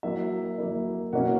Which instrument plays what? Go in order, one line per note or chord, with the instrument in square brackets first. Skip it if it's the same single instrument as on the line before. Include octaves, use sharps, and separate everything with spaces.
[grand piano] F#3 A#3 E4 E5
F#3 A#3 E4
B2 A#3 C#4 E4 F#4 F#5